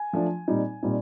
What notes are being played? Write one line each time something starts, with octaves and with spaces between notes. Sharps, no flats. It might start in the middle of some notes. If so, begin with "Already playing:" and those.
Already playing: G#5
F3 A3 D4
A#2 G3 C4 D#4
A#2 G3 C4 D#4